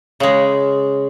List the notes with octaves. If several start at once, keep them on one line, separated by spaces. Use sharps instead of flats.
C#3 G#3